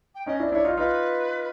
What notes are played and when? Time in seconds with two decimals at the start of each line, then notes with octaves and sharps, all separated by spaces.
0.15 G5
0.26 C#4 D#4 D#5
0.39 D4 E4
0.47 C5
0.52 D4 E4 C#5
0.65 D#4 F4
0.77 D#4 F4 B4